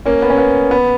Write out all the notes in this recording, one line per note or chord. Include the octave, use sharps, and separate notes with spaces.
A#3 C#4
B3
C#4
B3
B3